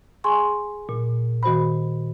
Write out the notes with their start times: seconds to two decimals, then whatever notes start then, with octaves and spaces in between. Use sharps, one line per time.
0.24 G#4 G#5 C6 C#6
0.89 A#2
1.43 D#3 F#4 C5 B5